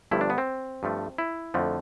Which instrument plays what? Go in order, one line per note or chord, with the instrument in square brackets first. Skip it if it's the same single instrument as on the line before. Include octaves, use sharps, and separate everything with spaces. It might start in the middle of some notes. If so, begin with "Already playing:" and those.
[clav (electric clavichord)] G1 G2 F3 A3 E4
D4
B3
C4
G2 F3 A3
E4
F2 D3 F3 A3